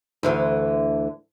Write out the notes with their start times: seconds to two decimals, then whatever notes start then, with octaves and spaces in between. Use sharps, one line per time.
0.23 D2 D3 E3